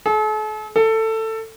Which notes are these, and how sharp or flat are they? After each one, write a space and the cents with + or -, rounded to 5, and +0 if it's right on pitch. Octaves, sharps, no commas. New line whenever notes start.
A4 -45
A4 +15